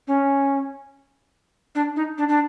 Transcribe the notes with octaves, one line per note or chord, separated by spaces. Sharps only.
C#4
D4
D#4
D4
D4